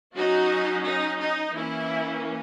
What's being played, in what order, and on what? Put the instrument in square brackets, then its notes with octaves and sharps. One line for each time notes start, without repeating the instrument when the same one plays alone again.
[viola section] F#3 C#4 D#4 F#4
D#4
D#4
E3 A#3 C#4 E4